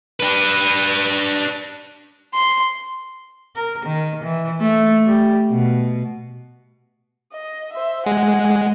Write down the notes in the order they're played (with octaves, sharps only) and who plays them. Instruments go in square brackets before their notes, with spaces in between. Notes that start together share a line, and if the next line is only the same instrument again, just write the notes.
[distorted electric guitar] D4 B4
[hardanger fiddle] C6
[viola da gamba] A#4
D#3
E3
A3
G3
B2
[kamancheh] D#5
C5 E5
[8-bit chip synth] G#3 [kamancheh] F#5 G#5